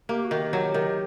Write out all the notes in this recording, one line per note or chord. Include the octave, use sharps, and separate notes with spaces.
A#3 G4
F#4
D#3
G4
F#3
D#3